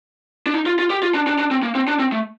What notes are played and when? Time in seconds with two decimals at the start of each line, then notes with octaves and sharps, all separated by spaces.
0.46 D4
0.54 D#4
0.66 F4
0.79 F4
0.90 G4
1.03 F4
1.14 D4
1.27 D4
1.38 D4
1.51 C4
1.63 A#3
1.75 C4
1.88 D4
1.99 C4
2.12 A3